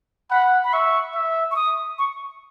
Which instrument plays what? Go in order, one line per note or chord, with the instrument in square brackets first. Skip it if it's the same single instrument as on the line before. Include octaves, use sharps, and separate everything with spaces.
[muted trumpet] F#5 [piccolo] B5
[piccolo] B5
[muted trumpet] E5 [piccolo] C#6
[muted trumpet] E5
[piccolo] C#6
D#6
C#6